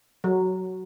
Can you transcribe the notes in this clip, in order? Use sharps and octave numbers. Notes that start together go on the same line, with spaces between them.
F#3